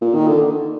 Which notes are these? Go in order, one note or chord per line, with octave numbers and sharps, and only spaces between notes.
A#2
D#3
D3